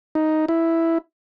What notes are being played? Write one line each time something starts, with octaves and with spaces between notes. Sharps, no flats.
D#4
E4